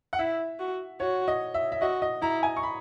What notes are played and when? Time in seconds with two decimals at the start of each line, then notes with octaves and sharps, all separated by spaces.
0.13 F#5
0.19 E4 E5
0.60 F#4
1.00 F#4 C#5
1.28 D#5
1.54 E5
1.72 E5
1.81 F#4 D#5
2.02 D#5
2.22 E4 A#5
2.43 G#5
2.57 C#6
2.63 B5